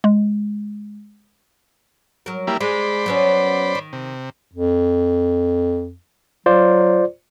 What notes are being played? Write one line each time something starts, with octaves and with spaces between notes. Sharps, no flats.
G#3
F#3 A#4
G3 A#3 E4
G#3 C5 D5 B5
F#3 B3 C#4
D#3
C3
F2
F#3 F4 C5 D5